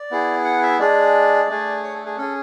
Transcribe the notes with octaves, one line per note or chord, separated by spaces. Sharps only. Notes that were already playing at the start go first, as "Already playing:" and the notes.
Already playing: D5
B3 E4 G#4
F#5
E5
G#3 D4 G#4 D5
A3 D4 G#4
C#5
A4
G#4
C#4 G#4 A4